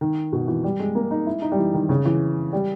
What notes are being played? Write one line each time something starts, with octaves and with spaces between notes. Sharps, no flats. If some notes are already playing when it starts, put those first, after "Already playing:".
D#3
B2
E3
G3
G#3
A#3
D#4
E4
D#4
G3
E3
D#3
C#3
E3
G3